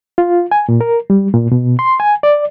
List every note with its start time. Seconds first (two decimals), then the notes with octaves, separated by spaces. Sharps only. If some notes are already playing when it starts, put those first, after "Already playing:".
0.18 F4
0.51 G#5
0.69 A#2
0.81 A#4
1.10 G3
1.34 A#2
1.52 B2
1.79 C6
2.00 G#5
2.23 D5